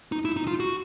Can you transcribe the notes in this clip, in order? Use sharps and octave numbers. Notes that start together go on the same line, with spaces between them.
D#4
E4
D#4
F4
F#4